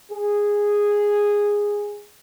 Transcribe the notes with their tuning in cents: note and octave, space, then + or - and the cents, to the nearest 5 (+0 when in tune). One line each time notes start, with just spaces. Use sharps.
G#4 -10